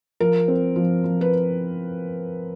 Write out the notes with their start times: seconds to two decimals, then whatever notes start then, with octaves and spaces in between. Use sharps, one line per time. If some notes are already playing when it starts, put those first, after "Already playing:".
0.20 F3 A#4
0.48 C4
0.76 F3
1.04 F3
1.21 B4